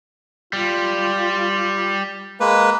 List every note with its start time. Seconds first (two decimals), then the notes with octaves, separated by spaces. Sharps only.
0.53 G3 F4
2.40 G#3 A#3 B4